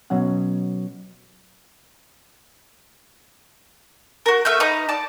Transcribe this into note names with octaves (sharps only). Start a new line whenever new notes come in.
B2 F#3 C#4 F#5
F#4 A#4
A3 E5 F6 G6
D#4 B4 A#5
D5 A5